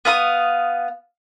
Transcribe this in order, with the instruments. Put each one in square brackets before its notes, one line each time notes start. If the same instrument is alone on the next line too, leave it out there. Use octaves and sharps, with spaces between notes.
[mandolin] B3 F5 D#6